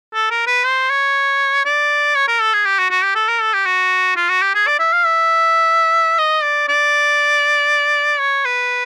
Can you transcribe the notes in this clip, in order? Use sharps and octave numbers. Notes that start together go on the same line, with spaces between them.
A4
A#4
B4
C5
C#5
D5
C#5
A#4
A4
G#4
G4
F#4
F#4
G4
A4
A#4
A4
G4
F#4
F4
F#4
G4
G#4
D5
E5
F5
E5
D#5
D5
D5
C#5
B4